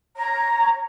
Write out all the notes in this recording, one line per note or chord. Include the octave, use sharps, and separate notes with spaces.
C#5 A#5